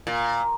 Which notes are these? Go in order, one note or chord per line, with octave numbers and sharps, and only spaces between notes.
A#2